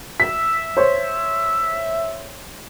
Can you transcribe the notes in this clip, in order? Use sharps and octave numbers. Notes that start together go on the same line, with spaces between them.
E5 B6
C5 C#5